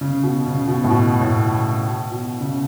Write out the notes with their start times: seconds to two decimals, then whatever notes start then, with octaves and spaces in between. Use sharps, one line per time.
0.01 C#3
0.23 B2
0.46 C#3
0.68 B2
0.84 A2
0.90 B2
1.21 A2
2.11 B2
2.41 C#3